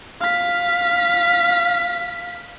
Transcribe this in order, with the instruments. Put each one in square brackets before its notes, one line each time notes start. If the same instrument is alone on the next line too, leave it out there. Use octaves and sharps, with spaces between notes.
[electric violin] F5 B6